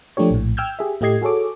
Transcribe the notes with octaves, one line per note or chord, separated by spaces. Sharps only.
F3 A3 D4 G4 C#5
A#1 A2
G5 E6 F6 G6 G#6
G4 G#4 E5
A2 A3 G4 D#5 G#6 C7
F#4 G#4 A4 C#5 D6